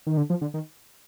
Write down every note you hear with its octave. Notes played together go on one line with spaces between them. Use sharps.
D#3
D3
F3
D3
D#3